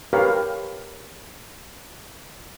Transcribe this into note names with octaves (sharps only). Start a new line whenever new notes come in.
G4 A#4 B4 C#5 F5